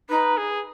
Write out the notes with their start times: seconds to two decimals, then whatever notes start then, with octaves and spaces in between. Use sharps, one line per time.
0.10 D#4 B4
0.38 G#4